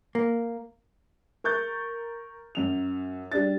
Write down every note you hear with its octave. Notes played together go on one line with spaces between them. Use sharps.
A#3
A#4 C#6 G6 A6
F#2 F7
G3 D4 A6